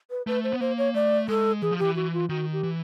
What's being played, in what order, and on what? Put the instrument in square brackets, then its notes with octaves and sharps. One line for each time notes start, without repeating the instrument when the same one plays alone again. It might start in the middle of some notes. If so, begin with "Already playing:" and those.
[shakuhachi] B4
[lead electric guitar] A3 [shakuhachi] B4
[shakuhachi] C5
[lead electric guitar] B3
[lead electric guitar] A#3 [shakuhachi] C5
[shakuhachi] C#5
[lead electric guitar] A3 [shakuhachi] D5
[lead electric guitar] G#3 [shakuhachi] A4
[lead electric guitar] E3 [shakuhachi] G#4
[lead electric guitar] F3
[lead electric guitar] E3 [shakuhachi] G4
[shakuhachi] F#4
F4
[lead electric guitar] D#3 [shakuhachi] F#4
[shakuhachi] G4
[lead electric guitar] E3